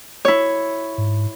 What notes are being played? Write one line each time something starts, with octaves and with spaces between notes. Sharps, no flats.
E4 C#5
G#2